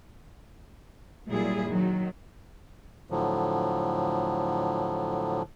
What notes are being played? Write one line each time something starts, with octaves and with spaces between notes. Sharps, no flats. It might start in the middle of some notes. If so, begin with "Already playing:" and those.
A#2 F#3 G3 E4 G#4
D#3 F#3
A2 D3 F3 F#3